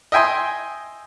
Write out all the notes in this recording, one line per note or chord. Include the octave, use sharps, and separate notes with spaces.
D#5 E5 G5 G#5 C6